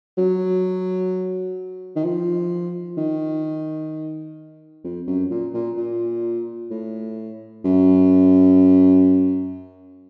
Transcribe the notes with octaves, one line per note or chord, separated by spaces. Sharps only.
F#3
D#3
F3
D#3
F2
F#2
A#2
A#2
A#2
A2
F#2